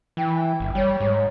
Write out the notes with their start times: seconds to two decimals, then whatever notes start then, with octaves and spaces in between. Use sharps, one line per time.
0.17 E3 G5
0.60 G1
0.75 G3 C#5
1.00 G#2